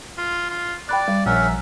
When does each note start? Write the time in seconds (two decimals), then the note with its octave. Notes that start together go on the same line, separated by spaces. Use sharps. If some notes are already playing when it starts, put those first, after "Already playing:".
0.18 F4
0.50 F4
0.89 D5 G5 B5 F#6
1.08 G3
1.26 A#1 C#4 A#4 E5 F#5